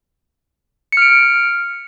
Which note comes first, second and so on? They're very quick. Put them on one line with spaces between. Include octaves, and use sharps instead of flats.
C#7 F6 D7